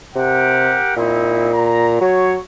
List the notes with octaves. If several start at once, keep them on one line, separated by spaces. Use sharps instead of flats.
C3 G4 A#4 F#5
A#2 C4 D#4 E4
A#5
F#3 C#5